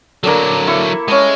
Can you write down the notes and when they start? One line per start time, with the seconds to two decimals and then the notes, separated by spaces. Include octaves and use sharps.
0.24 D3 F#3 A#3 D4 A4
0.67 E4 C#6
1.08 G#3 C#4 A5